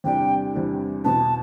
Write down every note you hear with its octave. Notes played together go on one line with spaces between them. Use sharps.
E2 C3 G3 D4 G4 G5
E2 C3 G3 D4 G4
E2 B2 B3 A5